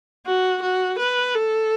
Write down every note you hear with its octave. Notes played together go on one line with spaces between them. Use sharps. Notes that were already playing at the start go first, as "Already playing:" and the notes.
F#4
F#4
B4
A4